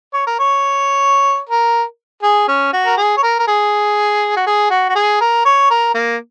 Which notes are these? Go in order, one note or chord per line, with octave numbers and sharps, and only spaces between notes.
C#5
A#4
C#5
A#4
G#4
C#4
F#4
A#4
G#4
C#5
A#4
A#4
G#4
F#4
G#4
F#4
F#4
G#4
A#4
C#5
A#4
A#3